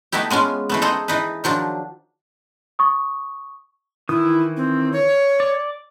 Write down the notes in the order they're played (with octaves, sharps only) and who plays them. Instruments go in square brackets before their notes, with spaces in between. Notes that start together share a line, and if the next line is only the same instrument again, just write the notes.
[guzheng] A3 B3 D#4 E4 G4
G#3 B3 C#4 F4
E3 A3 B3
D#4 G#4 A4 C5 F#5 A#5
E3 D#4 B4
D#3 F3 F#3 D4
[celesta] C#6 D#6
[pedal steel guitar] D#3 E3 D#6 [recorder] E4
[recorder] C4
C#5
[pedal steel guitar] D5